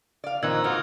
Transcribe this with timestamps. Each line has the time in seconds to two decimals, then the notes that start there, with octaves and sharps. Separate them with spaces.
0.24 D5 F5
0.43 F2 A#2 D#3 C4 D#4 B4 E6 G#6
0.64 G#2 D#4 F4 F#4 A#4